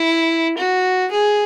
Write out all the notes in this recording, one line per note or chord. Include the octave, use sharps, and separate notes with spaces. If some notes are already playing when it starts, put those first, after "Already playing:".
Already playing: E4
F#4
G#4